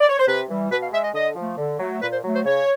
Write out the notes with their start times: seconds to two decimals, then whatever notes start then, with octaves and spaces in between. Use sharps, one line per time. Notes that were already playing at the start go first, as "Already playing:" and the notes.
0.01 D5
0.09 C#5
0.18 C5
0.27 C3 B4
0.49 E3 G3
0.71 B2 B4
0.81 F5
0.92 G#3 E5
1.04 D#5
1.14 D3 D#5
1.36 F3 A3
1.57 D3
1.79 F#3 A3
2.01 A#2 B4
2.12 C5
2.23 F#3 A3
2.34 C5
2.45 C#3 C#5